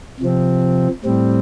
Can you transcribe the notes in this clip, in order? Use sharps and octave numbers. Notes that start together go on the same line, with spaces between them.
C3 F3 C4
A2 G3 C4